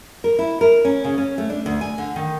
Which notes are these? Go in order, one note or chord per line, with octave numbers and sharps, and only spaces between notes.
A#4
E4
A#4
C#4
C#3
C#4
A3
D4
D2
G#5
D3
D#3